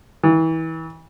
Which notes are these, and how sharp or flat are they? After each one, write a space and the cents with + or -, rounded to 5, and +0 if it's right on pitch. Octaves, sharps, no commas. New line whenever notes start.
E3 -30